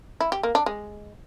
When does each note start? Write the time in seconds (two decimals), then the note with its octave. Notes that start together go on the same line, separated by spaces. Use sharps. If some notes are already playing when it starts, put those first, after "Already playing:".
0.21 E4
0.32 G4
0.43 A#3
0.55 D4
0.66 G#3